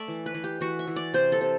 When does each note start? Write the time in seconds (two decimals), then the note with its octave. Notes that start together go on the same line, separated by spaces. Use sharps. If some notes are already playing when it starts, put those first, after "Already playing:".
Already playing: A3 D5 E5
0.08 E3
0.26 B4
0.34 E3
0.44 G4
0.61 E3 F#4
0.79 E5
0.87 E3
0.96 D5
1.14 C3 C5
1.32 A4
1.41 C3